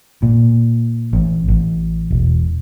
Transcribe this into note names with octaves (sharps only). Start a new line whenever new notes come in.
A#2
A1
A1
E1